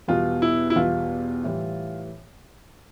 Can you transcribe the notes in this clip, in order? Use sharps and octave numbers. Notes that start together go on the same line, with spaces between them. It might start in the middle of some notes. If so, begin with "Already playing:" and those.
E2 B2 G3 F4
E4
E4
E2 B2 G3 F4
A2 E3 G3